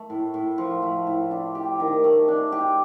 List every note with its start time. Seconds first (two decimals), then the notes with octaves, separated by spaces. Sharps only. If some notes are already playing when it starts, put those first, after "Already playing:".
Already playing: A3
0.10 A2
0.34 A2
0.58 F3
0.82 A3
1.07 A2
1.31 D4
1.55 G4
1.80 D#3
2.04 A3
2.28 D4
2.52 G4